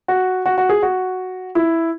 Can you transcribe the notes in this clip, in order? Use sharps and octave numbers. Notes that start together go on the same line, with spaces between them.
F#4
F#4
F#4
G#4
F#4
E4